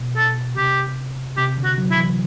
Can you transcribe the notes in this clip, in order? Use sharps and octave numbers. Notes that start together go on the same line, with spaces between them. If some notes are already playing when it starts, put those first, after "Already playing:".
Already playing: B2
A4
C3 G4
C3 G4
D3
F#4
F#3
E4
E3